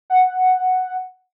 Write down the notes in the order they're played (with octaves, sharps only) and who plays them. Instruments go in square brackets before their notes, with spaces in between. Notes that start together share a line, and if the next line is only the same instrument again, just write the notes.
[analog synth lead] F#5